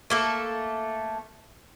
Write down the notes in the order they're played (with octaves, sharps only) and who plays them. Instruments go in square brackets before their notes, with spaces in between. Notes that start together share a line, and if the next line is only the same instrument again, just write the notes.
[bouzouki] A3 A#3 A4